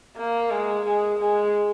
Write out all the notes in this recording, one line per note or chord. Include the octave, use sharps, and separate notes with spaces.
A#3
G#3
G#3
G#3